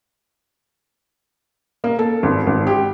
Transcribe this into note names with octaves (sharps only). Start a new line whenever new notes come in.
A#3
A4
G#1
G#1
G4